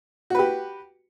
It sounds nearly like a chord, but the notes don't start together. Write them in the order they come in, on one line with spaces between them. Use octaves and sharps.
F#4 B4 G4